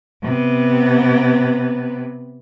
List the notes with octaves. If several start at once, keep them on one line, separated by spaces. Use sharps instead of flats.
C3 B3